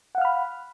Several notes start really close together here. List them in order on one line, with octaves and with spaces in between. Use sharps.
F#5 F5 F6 B5